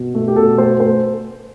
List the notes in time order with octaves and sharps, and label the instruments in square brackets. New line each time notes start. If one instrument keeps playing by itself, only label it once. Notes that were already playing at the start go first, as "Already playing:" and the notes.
Already playing: [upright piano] B2
A3
G4
B2 A4
A3 C5
A3 C5